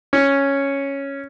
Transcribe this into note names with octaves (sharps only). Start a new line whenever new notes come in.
C#4